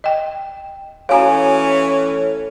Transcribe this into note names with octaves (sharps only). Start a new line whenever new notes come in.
D#5 G5
A2 E3 C#4 F#4 C#5 F5 G#5 A#5